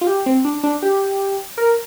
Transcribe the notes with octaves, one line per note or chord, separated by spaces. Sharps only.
F4
G4
C4
D4
D4
G4
A#4